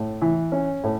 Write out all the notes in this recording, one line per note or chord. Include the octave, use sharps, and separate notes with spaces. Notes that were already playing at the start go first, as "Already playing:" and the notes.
Already playing: A2
E3
C#4
A2